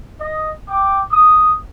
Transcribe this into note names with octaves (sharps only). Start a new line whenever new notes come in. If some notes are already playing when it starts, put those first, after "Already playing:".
D#5
G5 D6
D#6